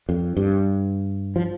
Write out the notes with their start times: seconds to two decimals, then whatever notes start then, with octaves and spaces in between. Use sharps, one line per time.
0.09 F2
0.37 G2
1.36 F3